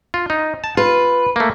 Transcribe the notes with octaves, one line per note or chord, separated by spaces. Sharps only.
F4
D#4
A5
F4 B4
A3 A#3